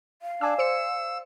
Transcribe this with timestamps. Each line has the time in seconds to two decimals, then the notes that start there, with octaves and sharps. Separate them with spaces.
0.22 F5
0.41 D4 D5 G#5 E6
0.59 C5 E6 C#7 E7